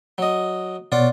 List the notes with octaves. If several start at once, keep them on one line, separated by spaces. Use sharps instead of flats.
F#3 D#5
B2 B3 F4 C#5 D5 F#5